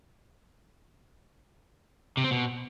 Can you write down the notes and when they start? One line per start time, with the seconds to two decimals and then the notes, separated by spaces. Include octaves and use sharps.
2.17 C3
2.24 C4
2.31 B2